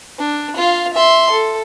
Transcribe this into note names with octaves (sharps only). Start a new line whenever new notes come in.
D4
F4 F5
E5 C6
A4